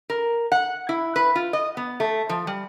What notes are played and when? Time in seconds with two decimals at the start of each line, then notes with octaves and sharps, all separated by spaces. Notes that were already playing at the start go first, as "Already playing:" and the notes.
0.10 A#4
0.52 F#5
0.89 E4
1.16 B4
1.35 F4
1.53 D#5
1.77 B3
2.00 A3
2.29 F3
2.47 G3